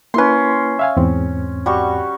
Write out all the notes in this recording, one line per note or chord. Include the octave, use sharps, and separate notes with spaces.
A#3 C#4 E4 B4 C6
E5 F5 G#5
E2 G#2 C4
G3 F#4 C#6